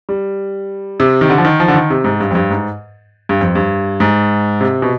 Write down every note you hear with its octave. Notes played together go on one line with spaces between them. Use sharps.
G3
C3
D#3
D3
F3
D#3
F3
D3
D#3
C3
G#2
G2
F2
G2
G#2
G2
F2
G2
G#2
C3
B2